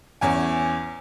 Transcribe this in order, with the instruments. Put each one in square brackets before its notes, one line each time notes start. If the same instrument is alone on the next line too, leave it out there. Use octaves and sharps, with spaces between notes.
[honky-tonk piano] E2 C#4 G#5